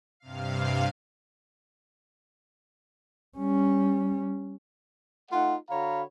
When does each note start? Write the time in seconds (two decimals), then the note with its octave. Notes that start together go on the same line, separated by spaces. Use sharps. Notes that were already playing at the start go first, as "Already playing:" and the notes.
0.20 G2 C3 F5
3.38 G3 C#4
5.31 A3 D#4 F4 F#5
5.70 D3 F#4 C#5 F5 A#5 B5